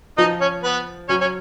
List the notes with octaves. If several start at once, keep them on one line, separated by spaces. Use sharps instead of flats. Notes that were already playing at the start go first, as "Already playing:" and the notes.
F3 D#4 D#5
C#4 C#5
B3 B4
F#3 C#4 C#5
C#4 C#5